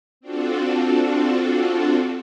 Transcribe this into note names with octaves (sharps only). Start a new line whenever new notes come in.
C4 D4 F4 F#4 A4